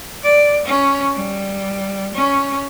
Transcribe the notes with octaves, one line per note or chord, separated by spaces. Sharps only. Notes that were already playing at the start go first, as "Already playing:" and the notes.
D5
C#4
G3
C#4